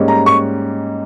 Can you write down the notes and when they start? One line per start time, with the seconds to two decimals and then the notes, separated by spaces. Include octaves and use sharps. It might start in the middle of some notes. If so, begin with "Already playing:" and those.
Already playing: G#2 G3 A#3 C#4
0.08 A#5
0.26 C#6